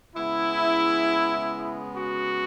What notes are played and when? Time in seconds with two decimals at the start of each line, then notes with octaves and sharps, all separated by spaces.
0.15 C#3 G#3 B3 E4
1.96 F#4